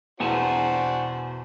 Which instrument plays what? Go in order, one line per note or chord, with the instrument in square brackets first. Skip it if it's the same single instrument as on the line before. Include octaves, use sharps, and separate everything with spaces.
[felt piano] E2 [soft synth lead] B2 [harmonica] D4 F#4 C5 [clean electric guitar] F#5 G#5 A5